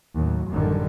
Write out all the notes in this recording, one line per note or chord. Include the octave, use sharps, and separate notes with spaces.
D#2 A2 F#3
A1 F#2 A2 D3 D#3 G3